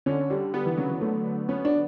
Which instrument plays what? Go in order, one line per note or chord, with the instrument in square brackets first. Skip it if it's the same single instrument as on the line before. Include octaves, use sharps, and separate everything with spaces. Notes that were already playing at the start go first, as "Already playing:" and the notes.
[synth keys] D3 [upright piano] C#4
[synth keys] D3 [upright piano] G3
[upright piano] G3 [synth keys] B3
[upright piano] E3
[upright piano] C#3 [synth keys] F#3
[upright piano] E3
[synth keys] D3 [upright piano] A3
[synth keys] D3
[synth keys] B3 [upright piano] C#4
[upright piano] D4